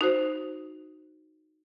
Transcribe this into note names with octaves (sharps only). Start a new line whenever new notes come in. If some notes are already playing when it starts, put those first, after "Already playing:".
D#4 F#4 C5